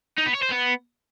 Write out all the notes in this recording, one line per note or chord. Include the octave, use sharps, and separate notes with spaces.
D#4
B3
C#5
C5
B3